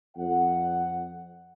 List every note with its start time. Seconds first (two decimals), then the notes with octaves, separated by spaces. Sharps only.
0.17 F2 F#5